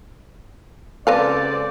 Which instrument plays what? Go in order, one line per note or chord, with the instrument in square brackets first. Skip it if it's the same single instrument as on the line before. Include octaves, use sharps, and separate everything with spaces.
[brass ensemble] C#2 C5 D5 [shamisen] C4 B4 F5 [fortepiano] A4